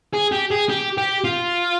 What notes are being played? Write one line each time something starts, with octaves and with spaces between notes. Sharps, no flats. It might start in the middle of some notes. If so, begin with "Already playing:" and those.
G#4
G4
G#4
G4
G4
F4